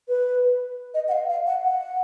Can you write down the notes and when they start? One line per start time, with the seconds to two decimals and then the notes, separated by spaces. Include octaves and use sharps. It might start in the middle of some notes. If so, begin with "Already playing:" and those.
0.08 B4
0.94 D#5
1.08 F#5
1.12 F5
1.30 F5
1.46 F#5
1.64 F#5